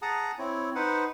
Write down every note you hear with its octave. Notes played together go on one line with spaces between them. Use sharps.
G#4 F#5 A5 A#5 D#6
C4 E4 C#5
D#4 B4 C5 F#5